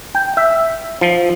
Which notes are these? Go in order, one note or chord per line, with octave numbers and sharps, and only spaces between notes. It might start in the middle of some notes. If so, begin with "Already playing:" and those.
G5
E5
F3